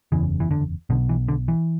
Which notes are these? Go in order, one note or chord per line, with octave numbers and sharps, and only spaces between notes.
F#1 E2 C#3 E3
E3
D3
B1 B2 D3
E3
D3
E3